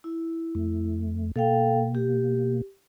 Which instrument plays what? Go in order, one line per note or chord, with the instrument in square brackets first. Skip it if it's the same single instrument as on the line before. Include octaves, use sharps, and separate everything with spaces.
[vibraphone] E4
[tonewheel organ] F2 A3
[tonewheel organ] B2 A#3 [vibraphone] A4 F5 G5
[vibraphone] G4